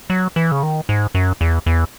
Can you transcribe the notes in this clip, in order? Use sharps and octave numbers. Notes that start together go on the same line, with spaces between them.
F#3
E3
C#3
D#3
G#2
F#2
E2
E2